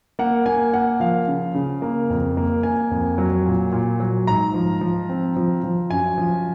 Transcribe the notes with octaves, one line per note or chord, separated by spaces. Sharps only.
A#3 F#5
A#3 G#5
A#3 F#5
F3 F5
C#3
C#3
A#3
F2
A#3
A#3 G#5
F2
F#3
A#2
A#2
F#3
G#2 A#5
F3
F3
C4
F3
F3
F#2 G#5
F3